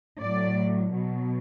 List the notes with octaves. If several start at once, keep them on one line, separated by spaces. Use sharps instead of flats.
A2 F#3 D5
B2 F#3